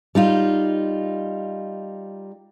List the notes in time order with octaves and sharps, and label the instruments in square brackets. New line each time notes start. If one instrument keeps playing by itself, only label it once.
[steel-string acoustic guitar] G3 D#4 F4